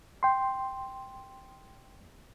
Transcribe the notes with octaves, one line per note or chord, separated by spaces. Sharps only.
G5 C6